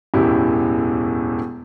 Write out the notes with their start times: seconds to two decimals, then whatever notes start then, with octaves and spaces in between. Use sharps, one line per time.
0.14 E1 F#2 A2 E4 G4